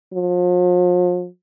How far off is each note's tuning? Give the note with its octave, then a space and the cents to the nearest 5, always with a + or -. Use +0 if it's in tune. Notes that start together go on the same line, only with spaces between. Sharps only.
F3 +40